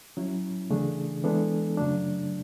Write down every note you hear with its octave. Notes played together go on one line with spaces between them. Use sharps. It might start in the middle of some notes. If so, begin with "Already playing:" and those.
F#3 C#4 E4
C#3 E3 A3 D4 G#4
E3 G#3 B3 D4 A4
F#2 C#3 F#3 A3 D4